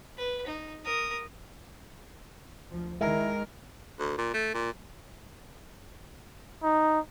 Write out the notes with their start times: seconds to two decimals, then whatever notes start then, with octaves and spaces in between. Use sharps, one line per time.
0.17 B4
0.46 D#4
0.85 A#4 D#6
2.69 D2 F3
3.01 D#3 G#3 E4 A#4
3.99 D2
4.18 A#2
4.34 A3
4.54 A#2
6.62 D#4